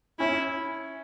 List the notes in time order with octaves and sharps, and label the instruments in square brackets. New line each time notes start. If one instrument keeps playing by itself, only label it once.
[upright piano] C#4 [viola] E4